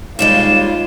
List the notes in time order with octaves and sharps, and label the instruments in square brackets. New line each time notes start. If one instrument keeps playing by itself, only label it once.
[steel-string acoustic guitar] D#2 G3 G#3 [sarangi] F4 [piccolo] E7